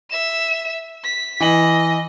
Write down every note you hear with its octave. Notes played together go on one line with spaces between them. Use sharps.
E5 E7
B6
E3 D#5 F#7